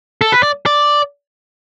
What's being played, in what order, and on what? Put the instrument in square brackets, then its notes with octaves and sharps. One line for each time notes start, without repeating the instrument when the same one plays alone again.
[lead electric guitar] A4
B4
D5
D5